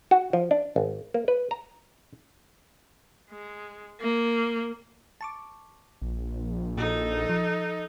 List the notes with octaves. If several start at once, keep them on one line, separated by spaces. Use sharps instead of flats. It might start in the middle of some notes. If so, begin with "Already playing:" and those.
F#4
F3
D4
G#1
A#3
B4
A#5
G#3
A#3
A5 C#6 D6
A#1
A#2 D#4 F#4 A4
F3